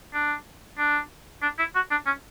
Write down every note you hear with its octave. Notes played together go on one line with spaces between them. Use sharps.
D4
D4
D4
E4
F#4
D4
C#4